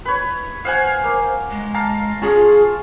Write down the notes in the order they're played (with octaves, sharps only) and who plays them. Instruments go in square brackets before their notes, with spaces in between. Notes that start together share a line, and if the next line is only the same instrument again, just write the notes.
[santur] B4 C#5
[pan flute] C5 [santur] F5 F#5 G#5
[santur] A#3
[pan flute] G#3
[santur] F5 A5 A#5
[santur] C#4 F4 A5 [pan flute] G#4